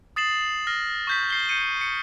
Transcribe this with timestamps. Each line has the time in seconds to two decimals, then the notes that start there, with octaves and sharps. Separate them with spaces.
0.16 D#6 A6 C7 E7 F#7
0.67 F6 A#6
1.07 C#6 G6 B6
1.30 F6 C7 G7
1.49 G6 C#7 D#7
1.81 C#7